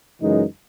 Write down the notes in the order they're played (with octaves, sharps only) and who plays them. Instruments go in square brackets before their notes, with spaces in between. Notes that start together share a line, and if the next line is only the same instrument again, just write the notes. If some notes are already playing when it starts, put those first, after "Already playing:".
[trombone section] F#2 C#3 E3 G#3 D#4